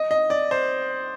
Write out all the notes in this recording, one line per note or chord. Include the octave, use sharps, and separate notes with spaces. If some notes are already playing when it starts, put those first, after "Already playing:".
Already playing: D#5
D#5
D5
C5